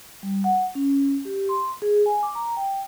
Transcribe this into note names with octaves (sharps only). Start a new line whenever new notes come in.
G3
F#5
C#4
G4
C6
G#4
G#5
D6
A#5
G5